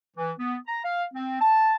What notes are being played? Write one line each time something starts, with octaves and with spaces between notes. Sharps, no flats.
E3
B3
A#5
F5
C4
A5